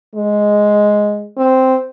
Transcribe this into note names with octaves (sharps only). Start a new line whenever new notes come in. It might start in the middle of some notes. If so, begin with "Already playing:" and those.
G#3
C4